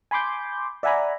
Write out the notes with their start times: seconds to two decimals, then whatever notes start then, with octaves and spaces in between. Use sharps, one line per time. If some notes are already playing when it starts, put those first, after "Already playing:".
0.11 G#5 B5 C6 D6 G6
0.83 D5 E5 F#5 G#5 A#5 B5